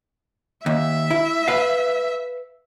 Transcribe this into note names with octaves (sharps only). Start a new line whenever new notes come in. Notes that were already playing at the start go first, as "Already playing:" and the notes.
D#2 E5
E4
B4 F5